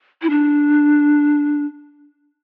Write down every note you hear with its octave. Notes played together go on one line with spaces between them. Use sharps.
E4
D4